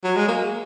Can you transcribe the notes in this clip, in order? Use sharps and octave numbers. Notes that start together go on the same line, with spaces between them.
F#3
G#3
A#3